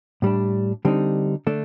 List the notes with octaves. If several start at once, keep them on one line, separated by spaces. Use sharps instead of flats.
A2 G3 D4
D3 G3 C4 D#4
D3 A3 D4